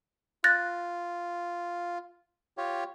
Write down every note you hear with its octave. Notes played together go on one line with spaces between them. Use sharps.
F4 F#6 A6 A#6
F4 G4 C#5